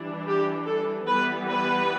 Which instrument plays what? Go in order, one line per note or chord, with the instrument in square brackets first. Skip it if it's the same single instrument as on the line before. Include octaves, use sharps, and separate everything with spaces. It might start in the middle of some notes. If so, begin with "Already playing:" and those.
Already playing: [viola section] E3 G3 D4
G4
A4
E3 G3 B3 B4
B4